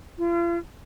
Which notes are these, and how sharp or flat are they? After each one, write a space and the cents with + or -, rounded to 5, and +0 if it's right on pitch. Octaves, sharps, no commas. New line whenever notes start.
F4 -40